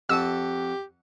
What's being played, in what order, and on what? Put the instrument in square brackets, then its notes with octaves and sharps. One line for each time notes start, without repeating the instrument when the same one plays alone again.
[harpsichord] F2 F#5 A5 [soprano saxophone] G4 [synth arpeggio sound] E6